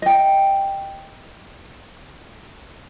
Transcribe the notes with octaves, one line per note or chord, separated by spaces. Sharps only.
D#5 G5